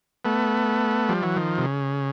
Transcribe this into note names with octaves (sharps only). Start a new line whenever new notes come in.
A3 B3
F3 G3
E3 F#3
D#3 F3
C3
C#3